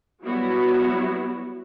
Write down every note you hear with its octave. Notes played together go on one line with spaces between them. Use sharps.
F#3 G3 B3 E4 F#4